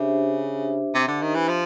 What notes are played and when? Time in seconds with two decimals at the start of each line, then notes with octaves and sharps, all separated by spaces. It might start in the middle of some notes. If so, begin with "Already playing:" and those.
Already playing: C#3 D4 G4 C5 E5
0.95 C3
1.08 D3
1.22 D#3
1.35 E3
1.48 F3